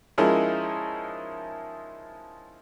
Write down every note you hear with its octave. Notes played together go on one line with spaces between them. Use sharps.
F3 G#3 C#4 D#4 E4 A#4